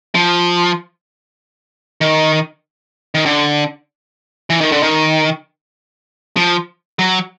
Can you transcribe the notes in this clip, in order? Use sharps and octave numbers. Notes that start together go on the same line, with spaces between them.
F3
D#3
D#3
D3
E3
D#3
D3
D#3
F3
F#3